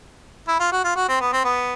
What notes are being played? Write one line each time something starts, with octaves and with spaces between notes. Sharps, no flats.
E4
F4
F#4
F4
F#4
C4
B3
C4
B3